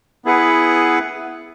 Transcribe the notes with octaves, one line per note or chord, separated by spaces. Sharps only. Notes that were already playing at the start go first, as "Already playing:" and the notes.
B3 E4 G#4 B4 F#5